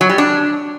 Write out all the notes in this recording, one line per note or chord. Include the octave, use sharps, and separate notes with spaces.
F#3
G3
D4